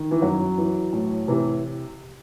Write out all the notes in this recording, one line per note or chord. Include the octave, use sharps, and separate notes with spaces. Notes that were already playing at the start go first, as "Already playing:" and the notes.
Already playing: D#3
E3
F#2 F#3
E3
A2
C3 E3